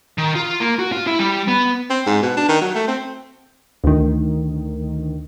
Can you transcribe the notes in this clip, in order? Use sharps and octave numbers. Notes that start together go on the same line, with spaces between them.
D#3
F4
A#3
F#4
F4
E4
G3
B3
C4
G#2
B2
D4
D#3
F#3
A3
C4
D2 D#3